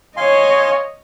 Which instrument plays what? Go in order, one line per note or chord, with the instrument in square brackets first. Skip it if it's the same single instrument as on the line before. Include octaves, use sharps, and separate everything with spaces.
[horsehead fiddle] C#5 D#5 [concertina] F5 G#5 C6